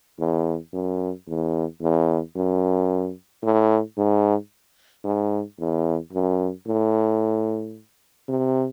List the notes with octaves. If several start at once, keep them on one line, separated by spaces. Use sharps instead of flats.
E2
F#2
E2
E2
F#2
A2
G#2
G#2
E2
F#2
A2
C3